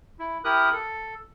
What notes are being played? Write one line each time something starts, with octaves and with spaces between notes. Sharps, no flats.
E4
E4 G4 A#4 D#6 F#6
A4